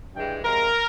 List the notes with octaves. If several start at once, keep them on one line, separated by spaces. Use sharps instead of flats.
G2 E3 G#3 G5
C3 F3 G#3 A#4